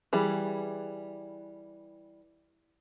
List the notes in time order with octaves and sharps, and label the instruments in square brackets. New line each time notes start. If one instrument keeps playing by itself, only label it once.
[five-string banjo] E3 G3 G#4